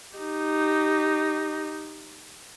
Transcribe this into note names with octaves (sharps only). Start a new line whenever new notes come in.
D#4 G4